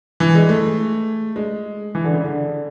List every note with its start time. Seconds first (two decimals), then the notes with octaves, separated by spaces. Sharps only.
0.20 E3
0.35 G#3
0.49 A3
1.36 G#3
1.95 E3
2.04 D3
2.14 C#3
2.24 D3